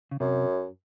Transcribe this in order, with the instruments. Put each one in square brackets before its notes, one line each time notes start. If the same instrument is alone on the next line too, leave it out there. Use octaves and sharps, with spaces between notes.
[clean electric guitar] C#3
[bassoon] F#2 [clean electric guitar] C3